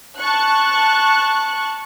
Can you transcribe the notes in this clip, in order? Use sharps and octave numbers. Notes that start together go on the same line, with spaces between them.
A5 C#6 F#6